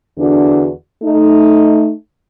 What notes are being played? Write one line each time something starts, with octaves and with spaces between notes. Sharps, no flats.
E2 D3 D4 F#4
A3 D#4